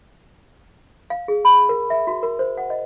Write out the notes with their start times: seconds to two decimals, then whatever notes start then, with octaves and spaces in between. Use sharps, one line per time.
1.10 F5
1.28 G#4
1.45 B5
1.69 A#4
1.90 E5
2.07 F#4
2.23 A#4
2.39 C5
2.57 F#5
2.70 D#5